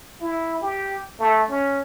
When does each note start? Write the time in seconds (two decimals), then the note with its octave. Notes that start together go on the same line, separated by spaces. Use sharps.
0.21 E4
0.61 G4
1.19 A3
1.49 C#4